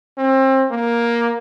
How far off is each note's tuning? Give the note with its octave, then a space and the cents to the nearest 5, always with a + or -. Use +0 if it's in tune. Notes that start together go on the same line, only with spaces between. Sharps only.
C4 +30
A#3 +10